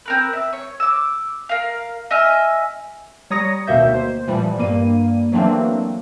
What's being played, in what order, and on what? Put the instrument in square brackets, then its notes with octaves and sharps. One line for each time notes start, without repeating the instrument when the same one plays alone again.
[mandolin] C4 A#4 B4
E5
C#5
D6 E6
A#4 F5
D#5 E5 G#5 F6
[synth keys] G3 C#5 A#5 D#6 A#6 C#7
D2 B2 D#3 A#3 E5 G6
C5
A#2 E3 F3 G3
G2 G3 A#3 D#7
E3 F#3 A3 A#3 C4 D4